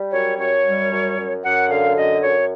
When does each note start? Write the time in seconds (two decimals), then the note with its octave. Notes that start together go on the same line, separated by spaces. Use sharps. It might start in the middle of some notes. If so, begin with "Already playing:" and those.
Already playing: G3
0.12 F#2 C#5
0.38 F#2 C#5
0.65 G3
0.92 F#2
1.17 F#2
1.43 F#2 F#5
1.69 D3 F5
1.96 F#2 D#5
2.22 F#2 C#5